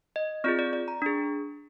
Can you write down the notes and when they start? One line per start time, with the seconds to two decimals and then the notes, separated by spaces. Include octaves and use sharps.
0.16 D#5
0.44 C4 F4 G#4 D5
0.59 D5
0.73 D5
0.88 A#5
1.02 D4 G#4